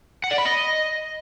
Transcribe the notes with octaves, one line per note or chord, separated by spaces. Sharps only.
F#5
D5
B5
D#5